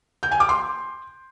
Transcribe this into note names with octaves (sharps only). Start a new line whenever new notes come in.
G6
G#5
D6
C6